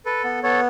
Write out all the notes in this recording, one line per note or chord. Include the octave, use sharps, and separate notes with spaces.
A4 B4
B3
B3 A4 C#5